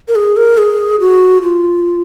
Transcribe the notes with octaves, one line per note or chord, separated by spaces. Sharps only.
A#4
G#4
A#4
G#4
F#4
F4